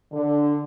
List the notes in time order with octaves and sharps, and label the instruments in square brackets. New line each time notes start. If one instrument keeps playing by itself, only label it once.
[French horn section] D3